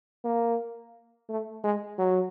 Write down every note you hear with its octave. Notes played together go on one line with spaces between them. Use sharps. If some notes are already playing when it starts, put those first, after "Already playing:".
A#3
A3
G#3
F#3